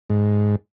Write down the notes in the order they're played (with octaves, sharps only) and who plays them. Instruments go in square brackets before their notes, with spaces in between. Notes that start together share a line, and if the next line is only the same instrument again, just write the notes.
[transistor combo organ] G#2